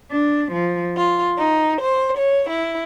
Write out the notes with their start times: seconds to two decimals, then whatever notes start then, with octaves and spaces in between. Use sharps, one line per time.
0.11 D4
0.52 F3
0.96 F4
1.38 D#4
1.80 C5
2.17 C#5
2.49 E4